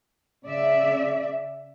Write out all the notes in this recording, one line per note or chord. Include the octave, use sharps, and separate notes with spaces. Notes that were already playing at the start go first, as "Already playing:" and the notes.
C#3 D5 E5